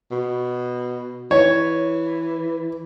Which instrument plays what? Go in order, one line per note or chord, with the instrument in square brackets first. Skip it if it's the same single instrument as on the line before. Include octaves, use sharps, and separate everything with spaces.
[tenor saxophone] B2
[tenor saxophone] E3 [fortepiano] C#5